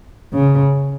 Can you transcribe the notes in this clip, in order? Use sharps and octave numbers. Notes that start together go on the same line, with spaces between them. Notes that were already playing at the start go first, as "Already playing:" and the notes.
C#3